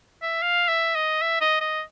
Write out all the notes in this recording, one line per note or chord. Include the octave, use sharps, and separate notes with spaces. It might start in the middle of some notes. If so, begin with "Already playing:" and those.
E5
F5
E5
D#5
E5
D#5
D#5